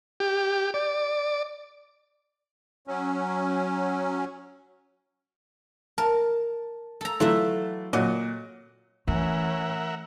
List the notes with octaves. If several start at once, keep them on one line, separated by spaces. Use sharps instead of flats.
G4
D5
F#3 C#4
A#4 A5
A4 A#5
E3 F#3 A3 F4 F#4 E5
A#2 F#3 D#5
E3 A3 C#4 A#4 E5 F#5